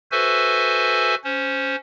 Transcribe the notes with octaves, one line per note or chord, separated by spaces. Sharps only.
F#4 A4 B4 C5 E5 G#5
C#4 C5